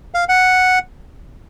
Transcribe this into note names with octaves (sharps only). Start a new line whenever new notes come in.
F5
F#5